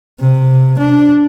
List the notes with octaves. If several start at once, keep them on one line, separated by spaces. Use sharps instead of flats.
C3
D4